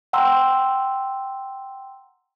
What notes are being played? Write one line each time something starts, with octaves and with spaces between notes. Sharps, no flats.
F#5 G5 A#5 C6 E6